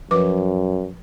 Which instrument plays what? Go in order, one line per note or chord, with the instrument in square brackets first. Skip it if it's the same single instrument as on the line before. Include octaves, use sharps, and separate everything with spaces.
[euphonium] F#2 [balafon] F3 B4 D6